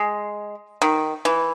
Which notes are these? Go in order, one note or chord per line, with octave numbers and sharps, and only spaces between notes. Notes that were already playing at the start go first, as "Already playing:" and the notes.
Already playing: G#3
D#3
E3